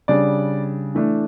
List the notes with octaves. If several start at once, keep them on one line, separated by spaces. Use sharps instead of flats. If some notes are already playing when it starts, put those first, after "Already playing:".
C#3 G3 D4 D5
E3 A3 D4